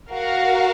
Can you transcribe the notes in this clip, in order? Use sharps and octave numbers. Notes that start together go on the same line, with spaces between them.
F#4 A#4 F5